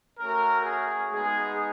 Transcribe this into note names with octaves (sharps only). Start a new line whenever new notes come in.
A3 C#4 F#4 A#4
G#4
G#3 B3 D#4 G#4